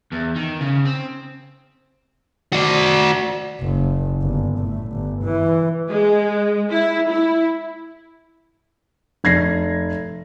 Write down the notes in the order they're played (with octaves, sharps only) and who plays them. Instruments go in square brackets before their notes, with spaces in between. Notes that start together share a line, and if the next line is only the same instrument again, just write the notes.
[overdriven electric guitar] E2
D#3
C#3
C4
F#4 D5
[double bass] F#1
G1
A2
G1
E3
[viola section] G#3
E4
E4
[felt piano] F1 G#6 A#6 C7